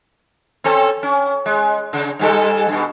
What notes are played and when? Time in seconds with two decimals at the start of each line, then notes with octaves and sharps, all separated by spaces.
0.64 C4 C#4 A4
1.03 C#4
1.46 G#3
1.93 C#3
2.19 G#2 G3 A4
2.69 G2 B2